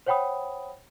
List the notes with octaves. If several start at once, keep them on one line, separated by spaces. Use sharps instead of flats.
C5 C#5 F#5 G5 B5 D#6